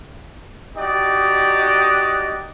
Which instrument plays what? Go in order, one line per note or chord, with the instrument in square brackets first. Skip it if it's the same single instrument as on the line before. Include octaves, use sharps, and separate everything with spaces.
[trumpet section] D#4 F#4 G4 D5 D#5